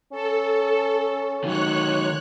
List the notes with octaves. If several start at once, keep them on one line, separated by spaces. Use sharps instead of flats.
C#4 A4
D#3 F#3 C#5 F#6